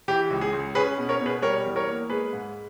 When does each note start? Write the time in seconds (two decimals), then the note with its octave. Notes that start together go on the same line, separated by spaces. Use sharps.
0.08 E3 G4
0.30 C#2
0.41 G#4
0.53 C#2
0.75 C#4 G#4 B4
0.98 B2
1.09 A#4 C#5
1.20 B2
1.26 G#4 B4
1.42 G3 A#4 C#5
1.65 E2
1.76 A#4 C#5
1.88 A#3
2.10 G#3 G#4 B4
2.33 G#2